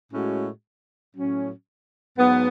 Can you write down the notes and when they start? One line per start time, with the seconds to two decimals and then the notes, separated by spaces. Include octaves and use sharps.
0.12 A2 G#3 C#4 F#4
1.15 A2 F#3 C#4
2.18 G#2 F#3 B3